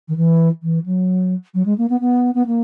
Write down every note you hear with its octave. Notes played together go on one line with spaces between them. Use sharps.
D#3
E3
E3
F#3
F#3
G#3
A#3
B3
B3
B3
A#3